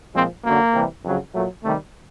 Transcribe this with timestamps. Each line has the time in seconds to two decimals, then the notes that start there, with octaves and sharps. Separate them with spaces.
0.14 A#2 F3 G#3 C4
0.44 F#2 D3 F#3 A#3
0.74 C3 E3 G3
1.03 F2 C#3 F#3
1.34 A#2 F#3 A3
1.63 C3 D#3 G3 A3